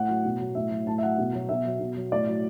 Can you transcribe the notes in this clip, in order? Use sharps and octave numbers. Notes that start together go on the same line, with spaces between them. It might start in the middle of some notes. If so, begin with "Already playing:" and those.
Already playing: A2 F#5
F#3
B2
F#3
A2 E5
F#3
A2 A5
E5
F#3 F#5
B2
F#3
B2 E5
F#3
B2
F#3
A2 D5
F#3